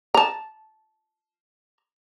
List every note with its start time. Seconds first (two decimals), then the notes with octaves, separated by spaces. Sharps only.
0.14 A5 A#5